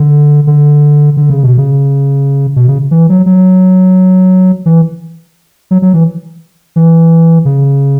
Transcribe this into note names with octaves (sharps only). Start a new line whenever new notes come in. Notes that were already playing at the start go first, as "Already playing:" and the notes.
Already playing: D3
D3
D3
C#3
B2
C#3
B2
C#3
E3
F#3
F#3
E3
F#3
F#3
E3
E3
C#3